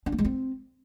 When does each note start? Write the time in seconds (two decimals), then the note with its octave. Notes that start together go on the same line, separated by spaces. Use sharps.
0.06 D4
0.12 A#3
0.18 G#3
0.25 C4